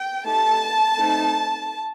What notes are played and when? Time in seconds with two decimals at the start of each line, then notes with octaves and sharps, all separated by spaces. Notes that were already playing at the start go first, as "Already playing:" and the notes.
Already playing: G5
0.25 A3 D#4 G4 A5
0.97 A3 C4 D#4 A4